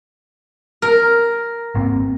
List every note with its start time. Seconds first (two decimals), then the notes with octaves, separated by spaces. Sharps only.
0.82 A#4
1.75 G#1 A#3 C4